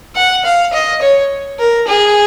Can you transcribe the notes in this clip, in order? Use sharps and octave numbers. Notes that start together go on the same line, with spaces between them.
F#5
F5
D#5
C#5
A#4
G#4